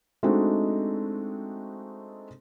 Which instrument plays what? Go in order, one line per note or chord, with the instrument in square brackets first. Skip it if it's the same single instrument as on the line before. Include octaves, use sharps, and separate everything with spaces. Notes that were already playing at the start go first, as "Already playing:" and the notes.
[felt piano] G#3 A3 C4 D4 D#4 F#4